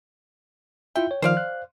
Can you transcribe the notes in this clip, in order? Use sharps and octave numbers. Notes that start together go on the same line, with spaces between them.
E4 F4 E5 G5
C#5
D#3 F3 C5 D5 F5
F#6